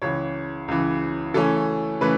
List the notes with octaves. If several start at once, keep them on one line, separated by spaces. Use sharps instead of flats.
C#2 C#3 E3 C#5
C#2 C#3 E3
C#3 E3 A3 C#4 A4
C#3 E3 A3 B4